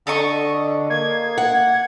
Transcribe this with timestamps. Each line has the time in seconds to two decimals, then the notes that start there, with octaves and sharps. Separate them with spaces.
0.07 D3 A4 D#5 C#6
0.90 A#3 G#6
1.38 F#5